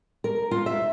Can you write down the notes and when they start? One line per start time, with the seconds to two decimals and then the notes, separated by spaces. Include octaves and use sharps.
0.24 A#4
0.51 F4
0.66 E5